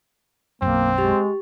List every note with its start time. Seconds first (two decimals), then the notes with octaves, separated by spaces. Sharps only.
0.62 B1 F#2 A#3 C4
0.98 G#3 G4